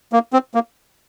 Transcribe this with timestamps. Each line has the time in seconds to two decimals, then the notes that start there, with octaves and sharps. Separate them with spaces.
0.13 A#3
0.33 C4
0.54 A#3